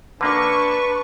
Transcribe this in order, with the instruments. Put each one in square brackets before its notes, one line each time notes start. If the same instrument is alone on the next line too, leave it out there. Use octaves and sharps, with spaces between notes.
[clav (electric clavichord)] D3 A#3 [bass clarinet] D4 [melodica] B4 [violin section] A5 C#6